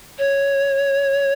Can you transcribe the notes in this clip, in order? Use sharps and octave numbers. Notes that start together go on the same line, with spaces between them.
C#5